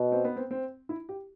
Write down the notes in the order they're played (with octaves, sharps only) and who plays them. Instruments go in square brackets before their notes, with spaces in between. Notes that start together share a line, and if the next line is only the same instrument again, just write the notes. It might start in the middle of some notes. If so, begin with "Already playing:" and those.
Already playing: [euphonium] B2
[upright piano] C4
B3
C4
C4
E4
G4